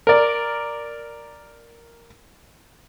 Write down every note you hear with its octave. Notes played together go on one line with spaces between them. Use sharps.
A#4 D5